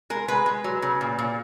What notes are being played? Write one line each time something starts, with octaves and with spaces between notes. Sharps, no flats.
G#3 A#4
G#3 B4
G#3
F#3
C#3
A#2
A#2